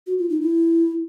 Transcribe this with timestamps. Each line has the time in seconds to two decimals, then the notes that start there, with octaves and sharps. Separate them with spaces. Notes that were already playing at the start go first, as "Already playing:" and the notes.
0.07 F#4
0.18 F4
0.30 D#4
0.41 E4